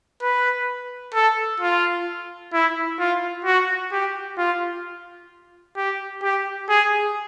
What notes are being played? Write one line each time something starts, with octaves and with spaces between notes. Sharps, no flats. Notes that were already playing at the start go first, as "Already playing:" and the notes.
B4
A4
F4
E4
F4
F#4
G4
F4
G4
G4
G#4